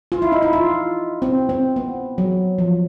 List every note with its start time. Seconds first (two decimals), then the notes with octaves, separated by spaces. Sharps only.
0.12 F4
0.22 E4
0.32 D#4
0.42 E4
0.53 F4
1.22 C4
1.49 C4
1.76 B3
2.18 F#3
2.58 F3